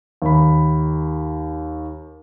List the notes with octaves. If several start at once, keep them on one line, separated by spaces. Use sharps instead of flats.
D#2 B5